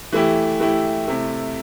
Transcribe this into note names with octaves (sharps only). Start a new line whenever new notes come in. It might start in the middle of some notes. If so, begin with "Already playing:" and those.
E3 A3 E4 G4
E3 A3 E4 G4
C3 A3 E4